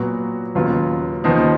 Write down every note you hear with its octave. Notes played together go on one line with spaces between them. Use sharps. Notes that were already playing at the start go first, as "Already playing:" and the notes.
Already playing: A#2 F#3 B3 F#4
D#2 C#3 F#3 B3 F4
D#2 C#3 F3 B3 D#4